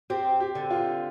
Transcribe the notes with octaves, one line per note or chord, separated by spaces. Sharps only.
C4 G4
G4
D3
F4